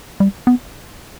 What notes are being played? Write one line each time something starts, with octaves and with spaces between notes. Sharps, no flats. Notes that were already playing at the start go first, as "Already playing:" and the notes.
G3
B3